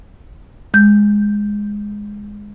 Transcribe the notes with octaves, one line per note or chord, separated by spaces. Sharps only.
G#3 G6